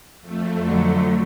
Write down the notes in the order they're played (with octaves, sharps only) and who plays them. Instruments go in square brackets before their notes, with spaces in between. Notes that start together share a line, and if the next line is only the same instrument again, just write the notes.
[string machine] F2 A3
[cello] D3 F#3